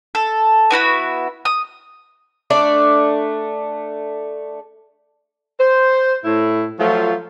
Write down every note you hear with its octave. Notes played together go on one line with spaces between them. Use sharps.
A4
B3 E4 F#4 B5
D#6
A3 D4 D5
C5
A2 E4
F3 F#3 A3 F4